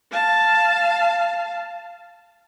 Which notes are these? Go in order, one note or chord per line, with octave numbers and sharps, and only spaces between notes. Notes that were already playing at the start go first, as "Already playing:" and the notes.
F5 A5